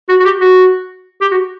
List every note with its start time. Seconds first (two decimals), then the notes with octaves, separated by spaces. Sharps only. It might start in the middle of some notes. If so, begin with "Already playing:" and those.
0.09 F#4
0.20 F#4
0.25 G4
0.41 F#4
1.21 G4
1.31 F#4